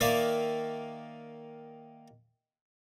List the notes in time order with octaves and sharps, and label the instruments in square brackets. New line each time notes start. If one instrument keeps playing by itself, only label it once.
[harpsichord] D#3 A#3 D5 E5 F5